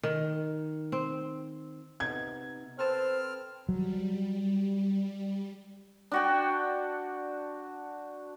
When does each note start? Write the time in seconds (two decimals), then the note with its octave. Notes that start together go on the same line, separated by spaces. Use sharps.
0.03 D#3
0.92 C4
2.00 C3 B3 D#4 G#6
2.79 C4 A4 B4 C5 A5 F6
3.69 F#3 G3
6.12 D4 F#4 G5